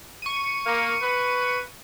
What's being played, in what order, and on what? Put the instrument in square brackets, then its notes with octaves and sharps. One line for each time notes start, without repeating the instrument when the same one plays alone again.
[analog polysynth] C#6 D#7
[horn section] A#3
B4